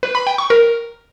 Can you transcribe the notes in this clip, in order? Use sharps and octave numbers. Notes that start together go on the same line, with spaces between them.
B4
B5
G5
C#6
A#4